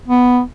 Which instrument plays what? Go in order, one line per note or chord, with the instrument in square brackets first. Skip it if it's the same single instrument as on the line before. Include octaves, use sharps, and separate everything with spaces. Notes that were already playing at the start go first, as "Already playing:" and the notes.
[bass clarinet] B3